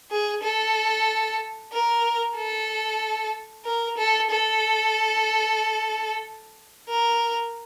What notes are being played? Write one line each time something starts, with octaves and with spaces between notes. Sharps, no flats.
G#4
A4
A#4
A4
A#4
A4
A4
A#4